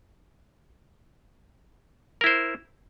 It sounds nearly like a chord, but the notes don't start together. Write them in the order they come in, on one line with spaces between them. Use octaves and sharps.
A#4 E4 C5